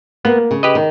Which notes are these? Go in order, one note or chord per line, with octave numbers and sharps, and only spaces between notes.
A#3 B3
C#3
G4 B4 D#5
D#3